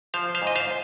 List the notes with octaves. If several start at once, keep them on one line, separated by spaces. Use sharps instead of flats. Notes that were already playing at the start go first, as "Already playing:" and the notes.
F3 C5 F5
C5 F5
G#2
D#5
C5 F5